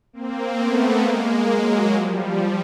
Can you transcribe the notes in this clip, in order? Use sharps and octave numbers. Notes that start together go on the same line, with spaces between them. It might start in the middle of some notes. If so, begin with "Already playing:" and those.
A#3 C4
A3 B3
G#3 A#3
F#3 G#3
F3 G3